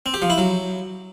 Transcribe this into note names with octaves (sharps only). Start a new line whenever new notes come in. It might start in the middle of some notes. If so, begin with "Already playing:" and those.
C4
G4
F3
E4
F#3